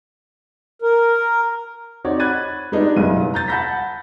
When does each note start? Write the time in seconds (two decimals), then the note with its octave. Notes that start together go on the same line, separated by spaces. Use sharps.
0.82 A#4
2.04 C4 D#4 F#4 C#5 D5
2.20 B5 F#6 G#6 A6 D#7
2.72 G3 G#3 B3 D4 D#4
2.96 F#1 G2 B2 D#7
3.34 A#5 G6 A6
3.48 F#5 A5 B5 G6 A#6 B6